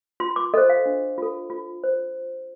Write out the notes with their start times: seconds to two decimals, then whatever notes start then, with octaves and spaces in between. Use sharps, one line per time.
0.20 F4 C6
0.36 D6
0.54 A4 C5 D#5
0.69 F5
0.86 D4
1.18 F4 A4
1.50 F4
1.84 C5